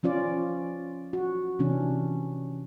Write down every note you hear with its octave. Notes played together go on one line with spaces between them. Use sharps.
F3 C#4 F4 D5
F#4
C3 E3 C#4 D4